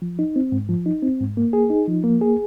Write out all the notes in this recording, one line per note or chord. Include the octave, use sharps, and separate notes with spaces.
F3
D#4
C4
G#2
F3
D#4
C4
G#2
A#3
G#4
D#4
F3
A#3
G#4